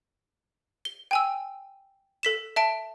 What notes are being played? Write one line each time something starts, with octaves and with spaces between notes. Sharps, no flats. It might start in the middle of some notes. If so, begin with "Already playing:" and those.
G7
G5 G#5 E6
A4 B6 E7
E5 A5 D7